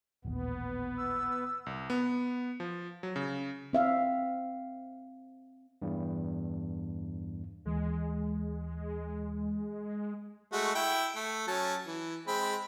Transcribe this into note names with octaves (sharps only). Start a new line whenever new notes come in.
D#1 A1 D#2 B3
E6
C2
B3
F3
F#3
C#3
C4 E5 F5
E2 G2
D#2 E3 G#3
G#3 A3 F#4
E4 G5
A3
F#3 C#4 A5
E3
G#3 C4 B5